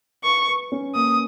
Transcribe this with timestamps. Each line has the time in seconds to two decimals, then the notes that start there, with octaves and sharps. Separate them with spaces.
0.24 B4 C#6
0.48 B4
0.72 C#4
0.95 A#3 D#6